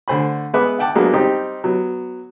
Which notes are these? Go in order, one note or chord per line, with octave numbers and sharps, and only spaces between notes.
D3 A3 C5 G#5 B5
G#3 B3 B4 E5 B5 D6
E5 F#5 G5 A5 D6
F#3 G#3 A#3 B3 D4
G3 C4 D#4 G4
F#3 B3